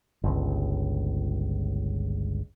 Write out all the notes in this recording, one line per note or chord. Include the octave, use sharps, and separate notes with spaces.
G1 C#2